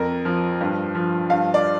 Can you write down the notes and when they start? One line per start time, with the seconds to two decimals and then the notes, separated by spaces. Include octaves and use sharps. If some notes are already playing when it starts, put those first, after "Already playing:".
Already playing: F2 A#4
0.25 F3
0.61 G2
0.95 F3
1.30 G2 F5
1.54 D5